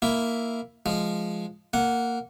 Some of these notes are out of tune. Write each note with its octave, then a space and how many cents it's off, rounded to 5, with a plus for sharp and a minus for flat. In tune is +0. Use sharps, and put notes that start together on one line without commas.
A#3 -5 E4 +0
F3 -5 G#3 +0
A#3 -10 F#5 -10